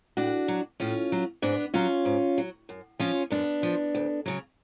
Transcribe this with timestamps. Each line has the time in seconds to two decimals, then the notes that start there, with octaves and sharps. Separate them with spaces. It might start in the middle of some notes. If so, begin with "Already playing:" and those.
0.17 A2 D4 F#4
0.48 F#3
0.80 A2 C#4 F4
1.12 F#3
1.42 G#2 B3 D4
1.74 F#3 C#4 F4
2.05 G#2
2.38 F#3
2.69 F#2
2.99 F3 C#4 F4
3.30 F#2 B3 D4
3.63 F3
3.94 D2
4.26 C#3 F#3